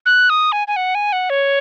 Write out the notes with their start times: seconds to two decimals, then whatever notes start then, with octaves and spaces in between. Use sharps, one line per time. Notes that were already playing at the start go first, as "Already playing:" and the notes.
0.06 F#6
0.30 D#6
0.52 G#5
0.68 G#5
0.76 F#5
0.95 G#5
1.13 F#5
1.30 C#5